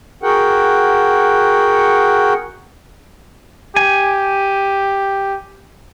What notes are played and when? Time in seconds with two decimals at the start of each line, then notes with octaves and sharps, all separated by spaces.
0.23 F#4 G#4 A#4 F#5 G5
3.76 G4 G#5